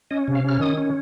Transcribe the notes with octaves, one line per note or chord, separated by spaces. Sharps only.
C#4 D#5
C3
F5
C#4 F6
D#3 D#6
C#4